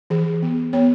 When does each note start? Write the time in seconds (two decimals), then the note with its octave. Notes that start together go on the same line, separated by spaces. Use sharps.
0.10 E3 G#4
0.42 B3
0.73 B3 C#5